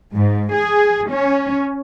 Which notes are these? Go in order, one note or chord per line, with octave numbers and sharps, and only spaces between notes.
G#2
G#4
C#4